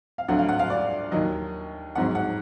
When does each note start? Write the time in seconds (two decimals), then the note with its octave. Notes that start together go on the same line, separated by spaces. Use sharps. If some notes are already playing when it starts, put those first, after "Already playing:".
0.18 F5
0.28 D2 D3 F#3 F#5
0.39 F5
0.49 F#5
0.59 F5
0.70 D5
1.11 D#2 D#3 F#3 D#5
1.95 G#1 G#2 F#3 F#5
2.15 F#5